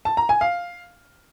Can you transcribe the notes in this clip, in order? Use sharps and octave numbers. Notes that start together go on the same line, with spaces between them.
A5
A#5
G#5
F5